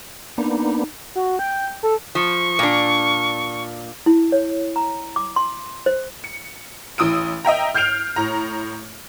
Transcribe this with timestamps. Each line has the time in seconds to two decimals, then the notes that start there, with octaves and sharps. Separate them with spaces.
0.38 A#3 B3 D4 D#4
1.15 F#4
1.39 G5
1.83 A4
2.15 F3 C#6
2.59 A#2 D4
4.06 E4
4.32 C#5
4.76 A#5
5.16 D6
5.36 C6
5.86 C5
6.24 C#7
6.98 A1 E3 D#6 E6 D7
7.45 D#5 E5 G5 A#5
7.74 F6 G6 C7 D7 F7
8.16 A2 A#5